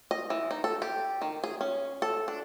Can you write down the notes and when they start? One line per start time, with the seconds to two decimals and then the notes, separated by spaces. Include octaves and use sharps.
0.11 D#5
0.30 E3
0.51 D#4
0.64 A4
0.82 G4
1.22 D#3
1.44 G#4
1.61 C#4
2.02 A4
2.28 D4